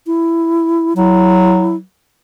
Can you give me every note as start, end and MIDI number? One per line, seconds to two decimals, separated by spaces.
0.07 0.94 64
0.97 1.81 54
0.97 1.76 64